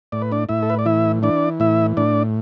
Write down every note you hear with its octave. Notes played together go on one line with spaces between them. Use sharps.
A2 D5
B4
D4 D5
A2 E4 E5
A4
B4
D5
E3 E4 E5
E3 D4 D5
A2 E4 E5
A2 D4 D5